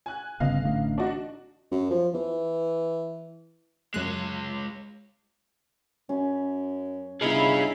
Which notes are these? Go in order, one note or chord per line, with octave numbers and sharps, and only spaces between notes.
G#5 F#6
G1 C#3 B3 D#5 F5
A1 D3 A3
D4 D#4 F#4
F#2
F3
E3
F#2 G#3 C#5 F#6
F#2 C#4
G1 D#4 E4 G#4 F5 B5